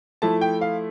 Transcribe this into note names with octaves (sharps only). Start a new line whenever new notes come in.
F3 A3 E4 A5
G5
F5